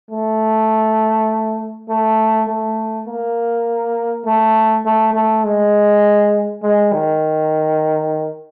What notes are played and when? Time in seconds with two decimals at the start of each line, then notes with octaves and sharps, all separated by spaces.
0.11 A3
1.89 A3
2.48 A3
3.07 A#3
4.26 A3
4.85 A3
5.14 A3
5.44 G#3
6.63 G#3
6.93 D#3